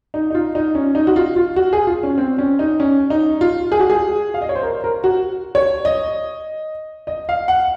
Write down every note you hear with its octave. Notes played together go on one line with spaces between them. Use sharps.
D#4
D#4
F4
D#4
C#4
D#4
F#4
F4
F4
F#4
G#4
F4
C#4
C4
C#4
D#4
C#4
D#4
F4
G#4
F#4
G#4
F5
D#5
C#5
C5
A#4
A#4
F#4
C#5
D#5
D#5
F5
F#5